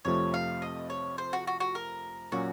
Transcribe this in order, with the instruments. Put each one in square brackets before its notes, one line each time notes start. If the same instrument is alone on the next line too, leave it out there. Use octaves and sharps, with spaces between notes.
[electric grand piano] F2 C3 F3 A3 [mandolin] C#5
[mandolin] F5
D#5
C#5
C5
F#4
F#4
F#4
A#4
[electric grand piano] A#2 F#3 A#3 C#4 [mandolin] F#4